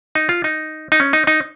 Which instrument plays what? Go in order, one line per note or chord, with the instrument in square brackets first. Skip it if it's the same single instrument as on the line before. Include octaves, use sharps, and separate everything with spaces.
[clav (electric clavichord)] D#4
F4
D#4
D#4
C#4
D#4
D#4